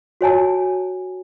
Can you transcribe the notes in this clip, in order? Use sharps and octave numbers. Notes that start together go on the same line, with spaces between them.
F#4 C#5 G#5 A5